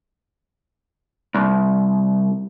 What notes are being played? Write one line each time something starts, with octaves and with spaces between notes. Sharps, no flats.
C2